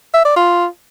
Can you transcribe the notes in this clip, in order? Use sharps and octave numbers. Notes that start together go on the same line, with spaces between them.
E5
D5
F4